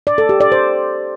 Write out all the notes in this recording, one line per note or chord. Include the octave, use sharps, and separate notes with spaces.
D5
A4
G4
D5
C5